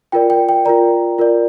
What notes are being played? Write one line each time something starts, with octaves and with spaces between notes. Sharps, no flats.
F4 A#4 D5 G5
G5
G5
F4 A#4 D5 A#5
F4 A#4 D5